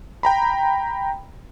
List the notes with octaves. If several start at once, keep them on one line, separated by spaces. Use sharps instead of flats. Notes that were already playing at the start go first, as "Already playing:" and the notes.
G5 A#5 B5